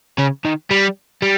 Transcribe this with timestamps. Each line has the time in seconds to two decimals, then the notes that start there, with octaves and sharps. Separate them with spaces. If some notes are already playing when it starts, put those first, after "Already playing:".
0.19 C#3
0.45 D#3
0.71 G3
1.22 G3